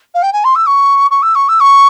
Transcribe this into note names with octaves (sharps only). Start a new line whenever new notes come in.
F5
G5
G#5
C6
E6
C#6
C#6
E6
C#6
E6
C#6